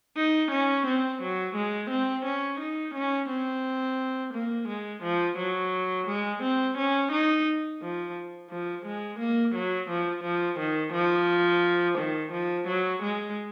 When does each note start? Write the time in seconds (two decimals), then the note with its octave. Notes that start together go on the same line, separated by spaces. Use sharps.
0.17 D#4
0.51 C#4
0.87 C4
1.22 F#3
1.56 G#3
1.90 C4
2.25 C#4
2.60 D#4
2.94 C#4
3.29 C4
4.33 A#3
4.68 G#3
5.03 F3
5.38 F#3
6.07 G#3
6.42 C4
6.77 C#4
7.12 D#4
7.82 F3
8.50 F3
8.85 G#3
9.19 A#3
9.55 F#3
9.90 F3
10.24 F3
10.59 D#3
10.93 F3
11.98 D#3
12.32 F3
12.67 F#3
13.02 G#3